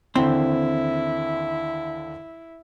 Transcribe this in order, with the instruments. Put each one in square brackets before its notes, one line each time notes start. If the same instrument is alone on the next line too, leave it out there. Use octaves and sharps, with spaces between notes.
[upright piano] D#2 D3 E3 [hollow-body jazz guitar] C4 C5 [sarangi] E4